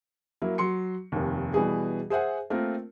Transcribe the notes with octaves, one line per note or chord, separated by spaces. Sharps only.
F#3 A#3 E4
F#3 C6 C#7
F1 D#2
B2 E3 G3 F#4 G#4
G#4 C5 E5 F#5 G#5
A3 A#3 C4 F4 A#4